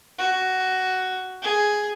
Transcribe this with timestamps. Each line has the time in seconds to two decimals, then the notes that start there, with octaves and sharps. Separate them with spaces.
0.19 F#4
1.42 G#4